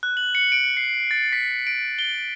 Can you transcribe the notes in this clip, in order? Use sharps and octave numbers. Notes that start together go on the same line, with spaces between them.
F#6
F#7
C#7
D7
C7
A6
B6
D7
G7